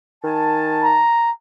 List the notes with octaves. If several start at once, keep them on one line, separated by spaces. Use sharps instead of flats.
D#3 G#5 A5
A#5